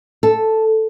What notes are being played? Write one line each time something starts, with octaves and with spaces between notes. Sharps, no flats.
A4